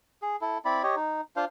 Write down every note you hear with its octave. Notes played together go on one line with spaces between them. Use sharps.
G#4
E4 A4
C4 E4 D5 B5
G4 C#5 D#5
D#4
D4 F4 C5 F5